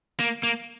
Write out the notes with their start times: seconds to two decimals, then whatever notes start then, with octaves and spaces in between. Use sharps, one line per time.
0.20 A#3
0.43 A#3